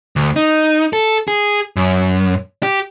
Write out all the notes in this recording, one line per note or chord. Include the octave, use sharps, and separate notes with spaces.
D2
D#4
A4
G#4
F#2
G4